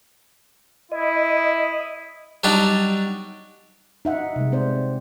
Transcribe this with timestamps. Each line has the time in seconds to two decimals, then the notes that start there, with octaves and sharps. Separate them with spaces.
0.92 E4 D#5
2.44 F#3 G3 D4 D#4 G4
4.05 D#4 E5 F#5
4.36 C3 G#3
4.52 C4 C5 D5